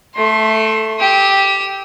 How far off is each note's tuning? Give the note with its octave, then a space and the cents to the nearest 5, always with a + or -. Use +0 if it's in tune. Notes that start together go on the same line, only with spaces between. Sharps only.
A3 +0 C6 +35
G4 +0 D#6 +45